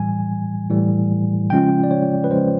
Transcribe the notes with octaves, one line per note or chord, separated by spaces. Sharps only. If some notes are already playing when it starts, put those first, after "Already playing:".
Already playing: A2 E3 G3 G#5
A2 E3 G3
C#3 F3 G#3 C#4 F4 G5
D5
C#5
B4
C#3 F3 G#3 C#4 F4 C5